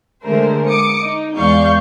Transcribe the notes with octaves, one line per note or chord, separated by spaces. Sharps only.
D3 G#3 A3 A#4 C5
D6 D#6 C#7
D#4
E2 G#3 D5 F5 C#6 G6